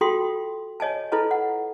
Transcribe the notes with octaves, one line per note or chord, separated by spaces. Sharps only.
F4 F#4 A4 G5 C6 D#6
C#5 D#5 G#5 A5
E4 F4 A4 B4 D#5 A5
F#5